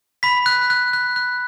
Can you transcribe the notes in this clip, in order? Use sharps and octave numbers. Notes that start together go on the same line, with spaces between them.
B5 B6
F#6
F#6
F#6
F#6